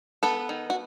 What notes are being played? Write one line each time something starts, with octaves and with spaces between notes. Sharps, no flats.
B3 A4 B4
D#3
F#4